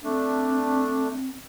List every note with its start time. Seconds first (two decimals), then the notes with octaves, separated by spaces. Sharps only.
0.04 A3 C4 D4